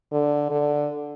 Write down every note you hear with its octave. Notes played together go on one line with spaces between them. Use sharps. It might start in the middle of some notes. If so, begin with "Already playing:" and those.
D3
D3